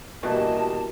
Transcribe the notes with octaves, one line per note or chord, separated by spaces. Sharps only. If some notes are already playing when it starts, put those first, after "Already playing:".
D2 G2 B2 E3 A#3 G4 D#5 A5